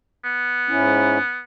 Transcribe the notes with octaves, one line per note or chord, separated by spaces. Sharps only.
B3
G#2 C#4 E4